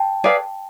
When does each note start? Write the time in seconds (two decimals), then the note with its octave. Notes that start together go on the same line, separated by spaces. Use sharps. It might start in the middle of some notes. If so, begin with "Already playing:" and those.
Already playing: G5 A5
0.24 G#4 B4 D5 F5